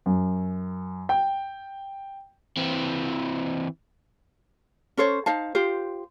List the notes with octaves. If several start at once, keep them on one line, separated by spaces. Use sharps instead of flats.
F#2
G5
E3 C4
C#4 A4 C5 C#5
D#4 C5 F5 A5
F4 G4 C5